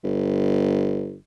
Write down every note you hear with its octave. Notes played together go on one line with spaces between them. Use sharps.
G1